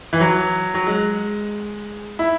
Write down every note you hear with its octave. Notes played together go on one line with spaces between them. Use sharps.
E3
F#3
F#3
G#3
E4